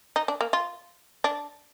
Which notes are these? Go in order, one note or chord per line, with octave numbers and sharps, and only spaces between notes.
D#4
D4
A#3
F4
D4